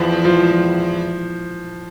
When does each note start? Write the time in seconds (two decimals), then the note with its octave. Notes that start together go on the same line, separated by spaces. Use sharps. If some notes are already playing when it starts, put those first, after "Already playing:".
Already playing: E2 F3
0.25 F3